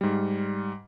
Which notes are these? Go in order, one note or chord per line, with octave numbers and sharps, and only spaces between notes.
G#2 G3